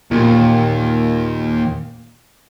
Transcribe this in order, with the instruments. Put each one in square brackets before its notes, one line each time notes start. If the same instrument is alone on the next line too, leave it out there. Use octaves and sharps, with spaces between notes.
[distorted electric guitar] D#2 [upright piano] A#2